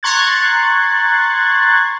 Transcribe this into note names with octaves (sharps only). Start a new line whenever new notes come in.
A#5 C6 C#6 F#6 G#6 A6